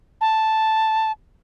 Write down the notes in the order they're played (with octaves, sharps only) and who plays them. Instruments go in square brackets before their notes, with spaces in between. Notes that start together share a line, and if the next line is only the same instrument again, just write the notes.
[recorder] A5